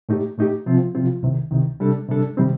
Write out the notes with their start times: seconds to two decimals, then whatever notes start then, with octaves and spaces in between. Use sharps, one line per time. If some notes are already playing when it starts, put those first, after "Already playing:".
0.09 A2 A3 D#4 G4
0.38 A2 A3 D#4 G4
0.66 C3 F3 C4 F4
0.95 C3 F3 C4 F4
1.23 C2 C3 D#3
1.51 C2 C3 D#3
1.80 C3 G3 D4 A4
2.08 C3 G3 D4 A4
2.37 C3 D#3 G3 C4